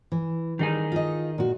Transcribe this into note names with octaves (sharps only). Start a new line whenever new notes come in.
E3
D#3 G3 D#4 G#4
F4 D#5
A#2 F#4